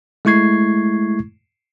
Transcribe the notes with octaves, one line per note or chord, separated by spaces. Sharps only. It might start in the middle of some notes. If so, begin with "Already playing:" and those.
G#3 A3 E4 C#6 G#6 C7